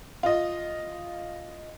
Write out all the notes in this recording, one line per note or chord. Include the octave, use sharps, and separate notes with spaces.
F4 D#5